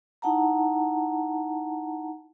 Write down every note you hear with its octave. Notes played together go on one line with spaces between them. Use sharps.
D#4 E4 F#5 A5 A#5